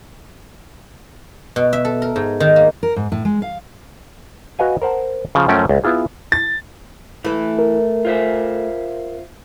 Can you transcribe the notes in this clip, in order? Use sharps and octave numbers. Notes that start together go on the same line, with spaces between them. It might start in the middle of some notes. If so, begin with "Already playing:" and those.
B2
E5
A4
A#4
G#2
D#3
A#3
A#4
G#2
A2
G#3
F5
F#4 B4 D#5 F5 G#5
A#4 C5 F#5 A5
C#3 F3
F#2 F3 A3 C#4 G5
C#2
B3 E4 F4 G#4
A6
E3 A3 B4
A#4
F4 C5 E5